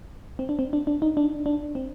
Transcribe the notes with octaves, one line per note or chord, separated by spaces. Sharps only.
C4
D4
C4
D4
D4
D#4
D4
D4
C4